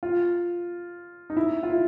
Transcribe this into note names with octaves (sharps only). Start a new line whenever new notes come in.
F4
D#4
E4
F4
E4